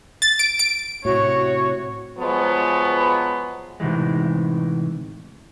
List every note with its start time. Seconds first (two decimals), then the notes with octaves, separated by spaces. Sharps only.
0.22 A6
0.39 D7
0.59 D7
1.05 A2 C3 F#4 C#5
2.18 F3 F#3 G#3 B3
3.80 A2 C3 D#3 E3 G#3